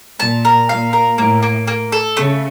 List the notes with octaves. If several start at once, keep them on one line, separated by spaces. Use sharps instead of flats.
A#2 A5
A#4
A#2 F5
A#4
A2 A#3
A#3
A#3
A4
C#3 A3